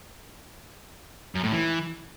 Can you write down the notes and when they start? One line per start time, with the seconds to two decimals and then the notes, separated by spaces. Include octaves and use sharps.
1.35 F#2
1.43 A2
1.52 E3